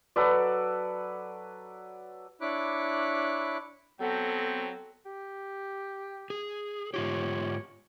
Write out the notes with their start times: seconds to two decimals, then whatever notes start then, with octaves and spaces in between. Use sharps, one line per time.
0.16 F#3 A4 B4 D5
2.41 D4 E4 C#5 B5 D6 F#6
4.01 F#3 B3 C4 A4 G5 A#6
5.06 G4
6.30 G#4
6.94 G#2 F4 G4 C#5